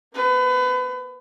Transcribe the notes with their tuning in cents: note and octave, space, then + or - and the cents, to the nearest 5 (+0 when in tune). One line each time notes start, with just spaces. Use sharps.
A#3 +40 B4 +30